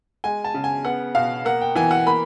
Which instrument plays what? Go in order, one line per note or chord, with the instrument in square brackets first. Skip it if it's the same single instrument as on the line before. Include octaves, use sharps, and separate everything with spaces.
[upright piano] G#3 G#5
A5
C#3
G#5
B3 F#5
B2 F5
A#3 F#5
G5
E3 G#5
F#5
A#3 B5